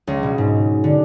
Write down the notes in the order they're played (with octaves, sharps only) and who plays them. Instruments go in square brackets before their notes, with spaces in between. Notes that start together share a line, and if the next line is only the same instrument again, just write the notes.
[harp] C#2
B2
G#2
D3